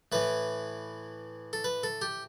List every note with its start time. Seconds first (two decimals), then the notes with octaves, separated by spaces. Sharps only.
0.12 A2 E3 B4
1.53 A4
1.64 B4
1.83 A4
2.02 G4